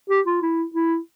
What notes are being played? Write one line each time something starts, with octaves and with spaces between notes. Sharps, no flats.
G4
F4
E4
E4